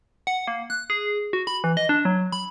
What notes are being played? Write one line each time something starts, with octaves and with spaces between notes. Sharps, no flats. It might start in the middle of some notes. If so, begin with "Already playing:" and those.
F#5
A#3
F#6
G#4
F#4
B5
E3
D#5
D4
F#3
B5